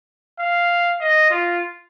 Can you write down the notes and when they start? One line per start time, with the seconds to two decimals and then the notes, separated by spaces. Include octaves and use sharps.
0.40 F5
1.01 D#5
1.31 F4